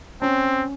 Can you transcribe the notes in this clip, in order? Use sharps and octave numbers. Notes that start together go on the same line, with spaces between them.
C4 C#4